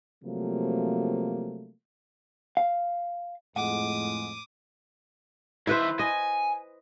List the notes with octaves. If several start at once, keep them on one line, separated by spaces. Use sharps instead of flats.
C3 F3 F#3 A3 A#3
F5
F2 A2 G#3 F#5 D6 D#6
D#3 E4 B4 C5 E5
D#5 G#5